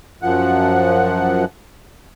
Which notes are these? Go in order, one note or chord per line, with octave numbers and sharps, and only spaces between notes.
F#2 F3 F#5